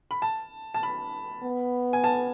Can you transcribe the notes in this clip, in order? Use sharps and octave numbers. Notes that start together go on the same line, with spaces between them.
B5
A5
A5
B5
B3
G#5
A5